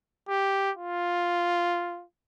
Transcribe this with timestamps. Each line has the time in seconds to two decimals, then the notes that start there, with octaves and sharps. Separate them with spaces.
0.29 G4
0.77 F4